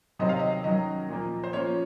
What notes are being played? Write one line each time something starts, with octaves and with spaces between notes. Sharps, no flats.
C3 D#3 F#3 C4 D#5
F5
D#5
D#3 F#3 C#4 D#5
A#2 F3 A#3
C5
F3 A#3 C#4 C#5